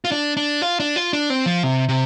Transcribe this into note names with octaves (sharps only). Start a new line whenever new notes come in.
F4
D4
D4
F4
D4
F4
D4
C4
F3
C3
C3